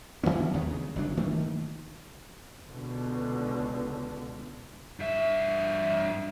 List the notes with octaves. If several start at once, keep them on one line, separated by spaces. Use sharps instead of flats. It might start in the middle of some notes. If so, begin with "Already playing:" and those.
D3 F#3 B3 C#4
D#2 D#3 G#3 B3
C#3
G1 F#3 D4
D#3 A3 A#3
C#2 B2 D3
G2 E5